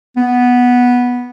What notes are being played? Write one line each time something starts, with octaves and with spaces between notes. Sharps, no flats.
B3